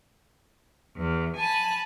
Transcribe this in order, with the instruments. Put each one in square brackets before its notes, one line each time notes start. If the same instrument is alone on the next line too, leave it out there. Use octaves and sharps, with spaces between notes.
[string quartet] E2
G#5 A5 B5